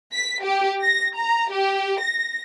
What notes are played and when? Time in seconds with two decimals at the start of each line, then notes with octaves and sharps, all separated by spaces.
0.13 B6
0.44 G4
0.82 A#6
1.16 A#5
1.51 G4
2.01 A#6